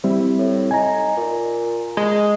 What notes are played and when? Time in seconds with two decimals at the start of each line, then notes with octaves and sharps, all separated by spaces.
0.04 G3 C4 E4
0.38 A2
0.71 D#4 G#5 A#5
1.17 A#2
1.97 G#3